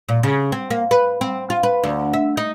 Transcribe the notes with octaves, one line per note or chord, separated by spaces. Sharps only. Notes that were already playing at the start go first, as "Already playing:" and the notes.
A#2
C#3
C4
A#3
B4
C4
F4
B4
D2
E5
D#4